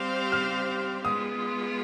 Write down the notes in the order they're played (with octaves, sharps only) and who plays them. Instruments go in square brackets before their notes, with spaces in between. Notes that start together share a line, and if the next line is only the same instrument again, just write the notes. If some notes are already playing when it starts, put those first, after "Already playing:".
Already playing: [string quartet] G3 C4 G4 C5 F5 [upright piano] F6
[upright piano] F6
[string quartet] G#3 B3 F4 [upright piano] D#6